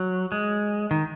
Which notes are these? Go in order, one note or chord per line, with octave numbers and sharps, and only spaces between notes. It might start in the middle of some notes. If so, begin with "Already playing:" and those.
Already playing: F#3
G#3
D#3